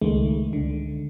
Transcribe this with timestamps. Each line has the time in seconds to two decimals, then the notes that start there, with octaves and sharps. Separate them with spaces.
0.01 C#2 D#3 G#3 A3
0.53 D3